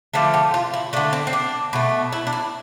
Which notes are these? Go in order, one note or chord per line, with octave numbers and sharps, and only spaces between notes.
D3 F3 A3 A4
G4
F4
E4
D3 A3 D4
C4
C4
D4
B2 A3
E4
D4
E4